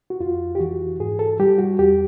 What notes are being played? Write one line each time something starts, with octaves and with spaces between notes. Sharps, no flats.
F#4
F2 F4
G4
E3 F#4
G#2 G#4
A4
G3 G4
F#4
E2 G4